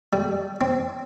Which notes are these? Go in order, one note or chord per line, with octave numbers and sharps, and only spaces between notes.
G3
C4